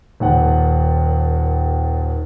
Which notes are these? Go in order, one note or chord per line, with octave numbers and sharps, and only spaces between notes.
D#1 D#2 F#5